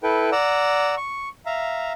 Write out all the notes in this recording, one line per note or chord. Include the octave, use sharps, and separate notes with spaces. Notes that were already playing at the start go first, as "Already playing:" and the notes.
E4 A4 B4 G5
D5 F#5 A#5 E6
C#6
E5 F5 A#5